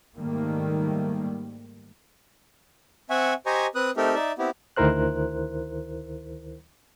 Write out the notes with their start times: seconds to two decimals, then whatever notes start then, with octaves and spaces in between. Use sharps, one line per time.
0.17 G#2 D#3 G3 A3 A#3
3.10 C4 E5 F#5 G#5 C#6
3.46 G4 C5 D#5 G#5 A#5 C#6
3.75 C4 B4 D#6 F#6
3.97 A3 C4 D#4 G4 A4 A#4
4.15 D#4 D5 E5
4.38 B3 C4 E4 G4
4.77 D2 D#3 E4 A#4 C5 F#6